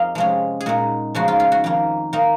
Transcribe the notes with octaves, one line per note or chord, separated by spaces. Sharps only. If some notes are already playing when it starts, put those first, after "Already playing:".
Already playing: F2 A#3 D#5 F5
C3 F3 G#3 C#4
G#4
A#2 G#3 D#4 F#4
C#3 F3 G#3 D#4 F#4
F4
F4
F#4
F2 D#3 A#3
D#3 A#3 D#4